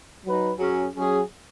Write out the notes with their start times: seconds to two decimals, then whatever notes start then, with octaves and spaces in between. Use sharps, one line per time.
0.24 F#3 D#4 B4
0.59 F#2 F#3 C#4 G#4
0.94 F#3 C#4 G#4